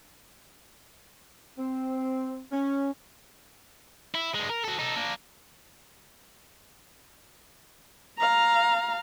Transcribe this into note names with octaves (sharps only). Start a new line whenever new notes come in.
C4
C#4
E4
G2 G#3
A#4
F#4 A4
D#4 A4
A#3 D4
F5 A#5